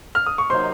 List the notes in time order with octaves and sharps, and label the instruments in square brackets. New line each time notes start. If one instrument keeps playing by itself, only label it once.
[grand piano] F6
D#6
C#6
[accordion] C3 F#3 A#3 D#4 [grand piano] C5 C6